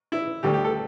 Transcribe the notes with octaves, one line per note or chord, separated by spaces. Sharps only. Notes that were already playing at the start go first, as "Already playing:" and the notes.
E4
D2 D3 G3 G4
G4
A4